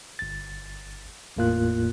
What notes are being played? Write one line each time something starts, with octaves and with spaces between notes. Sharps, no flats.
G1 A6
G1 E2 A2 A#3 F4 F#6